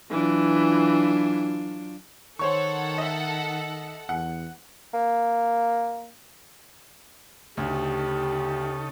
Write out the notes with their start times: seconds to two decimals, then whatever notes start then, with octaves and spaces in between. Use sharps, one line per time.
0.10 E3 F#3 D4 F4
2.39 D#3 A4 C5 C#5 F#5 C#6
2.98 D#5 E5
4.09 E2 F#5
4.94 A#3
7.57 D2 C#3 D#4 G4 A4